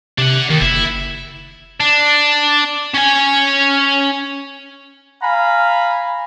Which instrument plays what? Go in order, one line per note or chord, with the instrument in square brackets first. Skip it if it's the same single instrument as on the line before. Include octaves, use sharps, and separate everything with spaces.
[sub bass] C3 [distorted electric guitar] D4 F#5
[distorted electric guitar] D#2 [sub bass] D#3
[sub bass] F#1 [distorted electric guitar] E4
[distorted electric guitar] D4
C#4 G#5
[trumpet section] F5 G#5 A#5 B5